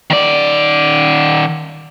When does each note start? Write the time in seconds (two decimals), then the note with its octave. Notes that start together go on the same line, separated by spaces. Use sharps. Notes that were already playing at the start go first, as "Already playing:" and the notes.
0.10 D#3 D5